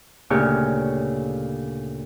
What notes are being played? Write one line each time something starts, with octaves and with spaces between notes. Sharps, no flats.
D2 A#2 C#3 G4 C#5 F6